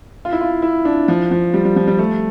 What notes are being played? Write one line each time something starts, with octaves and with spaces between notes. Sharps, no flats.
F4
E4
F4
E4
D4
F3
F3
G3
G3
F3
G3
A3